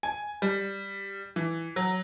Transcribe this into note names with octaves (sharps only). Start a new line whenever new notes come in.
G#5
G3
E3
F#3